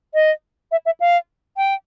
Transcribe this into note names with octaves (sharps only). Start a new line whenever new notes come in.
D#5
E5
E5
F5
G5